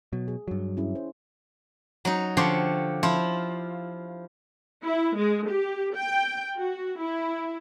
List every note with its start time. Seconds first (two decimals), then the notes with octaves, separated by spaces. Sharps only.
0.13 B2 F#3
0.28 G#4
0.48 G2 F#3
0.77 C#4 E4 G#4
0.95 C5
2.05 F#3 D#4
2.37 D3 F3 G4 C#5 C6
3.03 F3 E4 F4
4.86 E4
5.17 G#3
5.49 G4
5.96 G5
6.58 F#4
7.02 E4